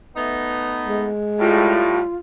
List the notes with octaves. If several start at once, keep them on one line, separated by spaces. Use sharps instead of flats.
A3 B3 D#4
G#3
A2 G3 F4